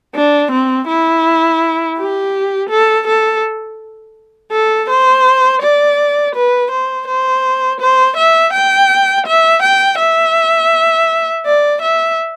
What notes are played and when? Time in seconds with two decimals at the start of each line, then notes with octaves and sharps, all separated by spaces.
0.15 D4
0.51 C4
0.87 E4
1.98 G4
2.70 A4
3.07 A4
4.52 A4
4.90 C5
5.62 D5
6.35 B4
6.71 C5
7.07 C5
7.80 C5
8.17 E5
8.53 G5
9.27 E5
9.63 G5
9.99 E5
11.46 D5
11.82 E5